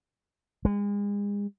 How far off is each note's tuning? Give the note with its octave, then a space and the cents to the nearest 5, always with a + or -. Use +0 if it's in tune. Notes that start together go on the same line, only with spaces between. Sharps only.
G#3 -35